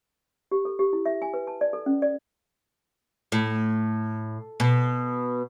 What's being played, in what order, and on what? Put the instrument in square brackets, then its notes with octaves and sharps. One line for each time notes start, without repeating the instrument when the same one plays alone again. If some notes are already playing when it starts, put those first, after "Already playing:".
[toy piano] G4
A4
G4
E4
E5
G#5
B4
A5
D5
A4
C#4
D5
[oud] A2
B2